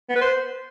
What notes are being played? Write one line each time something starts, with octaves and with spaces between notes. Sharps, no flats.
B3
B4
C5